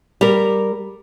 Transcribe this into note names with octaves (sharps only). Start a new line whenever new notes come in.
G3 A#4